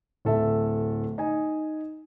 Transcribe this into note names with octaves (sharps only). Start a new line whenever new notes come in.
D1 A4 E5
D#4 G#5